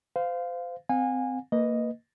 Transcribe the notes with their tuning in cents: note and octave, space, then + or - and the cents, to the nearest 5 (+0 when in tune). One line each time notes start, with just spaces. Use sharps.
C5 -30 F5 +0
C4 -25 F5 +45 G#5 -20
A#3 -20 B4 +0 D#5 +0